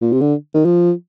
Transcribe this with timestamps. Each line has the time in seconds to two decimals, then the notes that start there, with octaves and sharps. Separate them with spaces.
0.01 A#2
0.12 C3
0.21 D3
0.54 D#3
0.65 F3